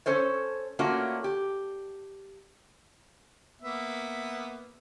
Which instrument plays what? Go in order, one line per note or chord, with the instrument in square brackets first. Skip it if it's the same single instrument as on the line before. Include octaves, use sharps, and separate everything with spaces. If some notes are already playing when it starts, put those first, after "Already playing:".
[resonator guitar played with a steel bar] C#4 A4 C5 C#5
A3 A#3 C#4 D4 F4 F#4
G4
[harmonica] A#3 B3 E5